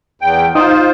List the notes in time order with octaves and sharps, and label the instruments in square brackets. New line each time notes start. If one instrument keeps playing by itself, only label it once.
[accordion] E2 G5
[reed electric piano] D#4 D#6 [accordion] F4 C5